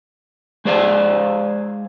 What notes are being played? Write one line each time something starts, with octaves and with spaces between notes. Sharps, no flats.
G#3 G#4 C5 D5 F5